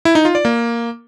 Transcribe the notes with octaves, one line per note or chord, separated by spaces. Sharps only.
E4
D#4
F4
D5
A#3